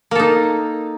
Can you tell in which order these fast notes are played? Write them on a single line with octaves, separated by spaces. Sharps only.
A#3 A4 D#4